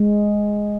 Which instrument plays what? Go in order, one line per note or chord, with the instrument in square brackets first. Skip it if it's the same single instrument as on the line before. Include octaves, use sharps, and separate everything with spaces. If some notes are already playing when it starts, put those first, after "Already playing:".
Already playing: [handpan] G#3